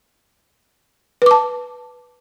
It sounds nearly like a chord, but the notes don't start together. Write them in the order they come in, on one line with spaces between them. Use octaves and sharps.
B4 D6 A5